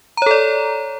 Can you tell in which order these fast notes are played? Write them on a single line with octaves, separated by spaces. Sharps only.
A#5 C#5 A4 D5